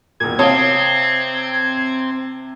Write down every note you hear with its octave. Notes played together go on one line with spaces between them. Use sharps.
E1 A#2 G#6
C3 C4 C#5 F5 A5 D#6